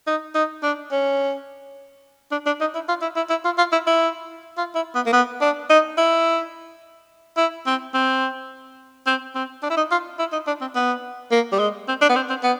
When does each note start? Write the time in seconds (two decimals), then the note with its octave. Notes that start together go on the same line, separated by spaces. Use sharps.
0.07 D#4
0.35 D#4
0.63 D4
0.91 C#4
2.31 D4
2.46 D4
2.60 D#4
2.75 E4
2.88 F4
3.02 E4
3.16 E4
3.30 E4
3.45 F4
3.58 F4
3.72 E4
3.87 E4
4.58 F4
4.75 E4
4.95 B3
5.06 A#3
5.13 B3
5.41 D4
5.70 D#4
5.98 E4
7.37 E4
7.67 C4
7.94 C4
9.07 C4
9.35 C4
9.63 D4
9.70 E4
9.77 D#4
9.92 F4
10.19 E4
10.32 D#4
10.47 D4
10.61 C4
10.76 B3
11.31 A#3
11.52 G3
11.59 G#3
11.88 C4
12.01 D4
12.09 B3
12.16 C4
12.30 C4
12.43 B3